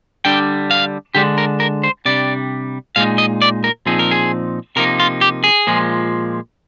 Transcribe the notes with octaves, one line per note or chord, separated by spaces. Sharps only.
D3 G3 D4 G5
F5
D3 G#3 D4 G4
A#4
A#4
C5
C3 G3 D4 D5
A#2 G#3 D#4 F5
D#5
D5
A#4
A#2 F3 C4 D#4 G#4
A#4
G#4
C3 F3 A#3 D#4 A#4
F4
G4
G#4
A#2 F3 G#3